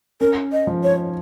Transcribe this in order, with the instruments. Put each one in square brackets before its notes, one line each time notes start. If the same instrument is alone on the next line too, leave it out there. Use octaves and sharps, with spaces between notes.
[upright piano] C#4 [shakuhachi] A#4
[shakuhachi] D#5
[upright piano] F3
[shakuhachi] C#5